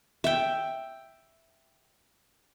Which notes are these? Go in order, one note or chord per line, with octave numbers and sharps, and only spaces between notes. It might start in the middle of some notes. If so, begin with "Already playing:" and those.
E5 G5